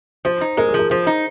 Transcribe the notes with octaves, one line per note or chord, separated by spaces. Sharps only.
F3 C5
D#4
G#3 A#4
G#4
F3 A#4
F3 C5
D#4